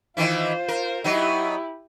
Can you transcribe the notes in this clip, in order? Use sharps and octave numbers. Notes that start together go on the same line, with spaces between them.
D#3 E3 E4 F4 C5
A#4
F#3 B3 D#4 E4 G4